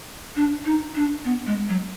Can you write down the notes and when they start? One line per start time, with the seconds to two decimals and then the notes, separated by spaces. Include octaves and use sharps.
0.36 D4
0.65 D#4
0.95 D4
1.25 B3
1.46 G#3
1.69 F#3